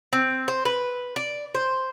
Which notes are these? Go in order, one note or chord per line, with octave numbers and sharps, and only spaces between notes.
C4
C5
B4
D5
C5